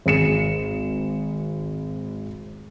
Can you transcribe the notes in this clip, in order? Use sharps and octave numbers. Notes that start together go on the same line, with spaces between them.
G#1 G#4 C#7 E7